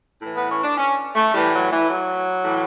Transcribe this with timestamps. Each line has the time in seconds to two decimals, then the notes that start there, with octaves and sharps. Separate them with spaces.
0.22 A2 E3
0.35 B3
0.49 C#4
0.63 D4
0.77 C#4
1.15 A3
1.33 A2 E3 G3
1.52 F#3
1.71 E3
1.88 F#3
2.44 A2 E3